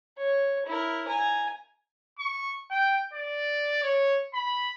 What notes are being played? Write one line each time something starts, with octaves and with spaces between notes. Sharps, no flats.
C#5
E4 A#4
G#5 A#5
C#6
G5
D5
C#5
B5